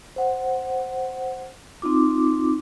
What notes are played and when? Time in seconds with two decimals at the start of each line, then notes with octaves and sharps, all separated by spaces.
0.16 C5 F#5
1.82 C4 D#4 F4 D6